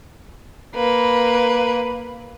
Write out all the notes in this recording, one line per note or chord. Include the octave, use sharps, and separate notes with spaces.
A#3 B4